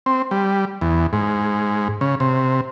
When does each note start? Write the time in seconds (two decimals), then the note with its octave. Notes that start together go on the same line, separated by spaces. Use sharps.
0.06 C4
0.31 G3
0.81 E2
1.13 G#2
2.01 C#3
2.20 C3